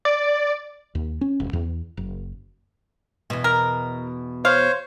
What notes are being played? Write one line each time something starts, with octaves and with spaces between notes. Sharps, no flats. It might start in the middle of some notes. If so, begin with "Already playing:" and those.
D5
D#2
C#4
E1
E2
F#1
E2 B2
A#4
C5 C#5 F5